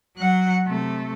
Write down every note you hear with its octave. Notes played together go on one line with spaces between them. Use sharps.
F#3 F#5
C3 A3